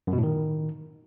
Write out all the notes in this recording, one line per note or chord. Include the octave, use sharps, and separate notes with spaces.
F#2
B2
A2
D#3